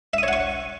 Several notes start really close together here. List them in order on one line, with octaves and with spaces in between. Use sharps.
E5 D#6 C#5 F#5 C#6